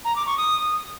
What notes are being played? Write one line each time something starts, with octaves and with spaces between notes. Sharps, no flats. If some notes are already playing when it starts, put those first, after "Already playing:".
A#5
D6
C#6
D#6